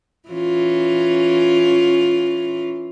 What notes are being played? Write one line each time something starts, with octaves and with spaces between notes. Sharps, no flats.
E3 C#4 F4